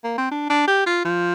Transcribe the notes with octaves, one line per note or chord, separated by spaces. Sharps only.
A#3
C4
D4
D4
G4
F4
F3